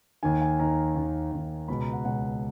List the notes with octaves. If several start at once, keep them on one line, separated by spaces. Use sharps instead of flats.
D#2 D#3 G#5
G#5
D#2 D#3 A#5
D#2 D#3
D#2 D#3
C#2 B2 B5
A#5
F#5
C#2 B2 F#5